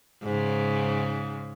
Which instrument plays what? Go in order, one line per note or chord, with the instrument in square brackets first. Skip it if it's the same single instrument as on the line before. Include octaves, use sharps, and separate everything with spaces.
[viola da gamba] G#2 C#3